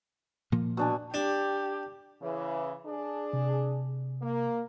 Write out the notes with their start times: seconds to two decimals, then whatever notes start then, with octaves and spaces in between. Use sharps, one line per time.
0.52 A#2 F3 A#3
0.77 B2 D4 G#5
1.14 D4 G4
2.22 C#3 E3
2.86 D4 G#4
3.33 C3
4.21 A#3